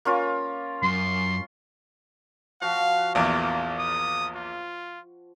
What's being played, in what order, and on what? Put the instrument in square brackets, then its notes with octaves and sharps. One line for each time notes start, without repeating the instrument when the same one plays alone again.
[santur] A#3 C#4 F4
[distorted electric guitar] F#2 [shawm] C6
[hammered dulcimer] F3 F#4 [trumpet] F5
[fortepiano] A#1 E2 [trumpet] A#3
[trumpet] D#6
F4